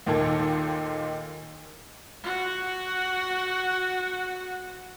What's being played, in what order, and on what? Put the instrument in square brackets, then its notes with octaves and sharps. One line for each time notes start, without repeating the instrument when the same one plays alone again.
[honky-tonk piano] D#2 A#2 D#3 D#4 A4 G#6
[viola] F#4 F#5